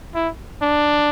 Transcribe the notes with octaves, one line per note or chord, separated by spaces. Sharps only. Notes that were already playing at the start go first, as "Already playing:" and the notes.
E4
D4